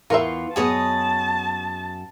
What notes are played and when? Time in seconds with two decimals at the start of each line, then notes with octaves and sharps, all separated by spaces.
0.10 E2 E3 F4 A#4 E5 C6 C#6
0.56 F#2 B3 G#4 C#5 D#5 A5